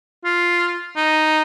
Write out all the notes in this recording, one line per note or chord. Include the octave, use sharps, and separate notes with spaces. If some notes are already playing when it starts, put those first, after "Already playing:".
F4
D#4